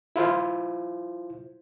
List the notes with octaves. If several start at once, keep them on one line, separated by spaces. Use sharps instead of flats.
E4 F4 C5